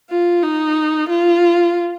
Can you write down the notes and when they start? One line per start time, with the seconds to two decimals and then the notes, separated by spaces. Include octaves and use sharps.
0.10 F4
0.43 D#4
1.09 F4